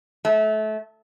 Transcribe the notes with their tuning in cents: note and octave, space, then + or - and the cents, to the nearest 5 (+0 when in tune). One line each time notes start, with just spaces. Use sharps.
A3 -25